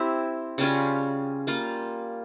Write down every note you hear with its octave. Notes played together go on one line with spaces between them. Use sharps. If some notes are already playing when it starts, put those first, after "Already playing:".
Already playing: C4 E4 G4 C5
C#3 G3 C#4 F4
G3 A#3 F4